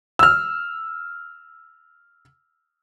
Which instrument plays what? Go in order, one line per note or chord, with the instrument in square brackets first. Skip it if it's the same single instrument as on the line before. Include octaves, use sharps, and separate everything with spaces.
[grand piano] E6 F6